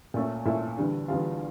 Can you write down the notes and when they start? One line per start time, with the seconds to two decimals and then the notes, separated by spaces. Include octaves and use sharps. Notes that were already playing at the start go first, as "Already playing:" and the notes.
0.14 A#2 A3 C#4
0.45 A#2 A3 C#4 E4 E5
0.77 E2 D3 G3 D4
1.08 E2 D3 G3 D4 F4 F5